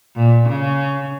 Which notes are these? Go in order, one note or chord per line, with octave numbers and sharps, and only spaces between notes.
A#2
C#3